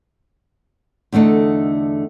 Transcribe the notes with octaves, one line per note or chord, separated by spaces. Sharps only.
E2 D3 A3 D4 D#4